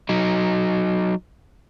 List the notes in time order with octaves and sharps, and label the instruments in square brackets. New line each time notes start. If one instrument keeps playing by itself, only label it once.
[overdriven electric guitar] F#3 D#4